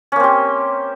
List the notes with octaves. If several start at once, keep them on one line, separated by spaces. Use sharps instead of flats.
A#3 C4 C#4 G4